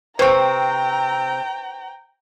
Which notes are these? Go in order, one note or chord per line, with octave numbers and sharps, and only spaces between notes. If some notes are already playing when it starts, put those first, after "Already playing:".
C3 C4 B4 C5 G5 A#5 C#6